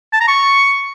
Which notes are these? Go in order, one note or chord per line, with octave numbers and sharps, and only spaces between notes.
A5
A#5
C#6